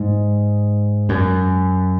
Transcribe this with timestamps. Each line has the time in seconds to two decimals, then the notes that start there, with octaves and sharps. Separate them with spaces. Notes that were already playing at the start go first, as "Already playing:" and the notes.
Already playing: G#2
1.09 F#2